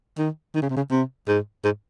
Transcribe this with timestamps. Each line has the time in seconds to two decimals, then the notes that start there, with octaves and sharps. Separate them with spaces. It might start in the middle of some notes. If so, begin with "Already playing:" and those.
0.18 D#3
0.55 D#3
0.62 C#3
0.70 C3
0.76 C#3
0.91 C3
1.28 G#2
1.64 G#2